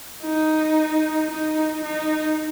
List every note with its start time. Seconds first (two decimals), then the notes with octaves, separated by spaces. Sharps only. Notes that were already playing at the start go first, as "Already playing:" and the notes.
0.22 D#4
1.30 D#4
1.83 D#4